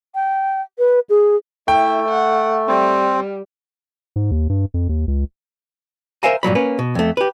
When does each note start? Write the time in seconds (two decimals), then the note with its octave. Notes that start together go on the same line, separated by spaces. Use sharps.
0.15 G5
0.78 B4
1.09 G#4
1.68 A3 E4 G5
2.09 F#5
2.68 G3 C4
4.16 G#2
4.31 D#2
4.49 G2
4.74 F2
4.89 D#2
5.08 C#2
6.23 A#4 C5 E5 F5 G#5 A#5
6.43 G2 A#2 F#3 B5
6.55 A#3 C#4 B4
6.79 B2
6.95 F2 A3
7.17 G4 B4